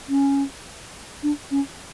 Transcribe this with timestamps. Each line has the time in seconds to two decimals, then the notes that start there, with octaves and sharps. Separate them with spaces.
0.09 C#4
1.23 D4
1.51 C#4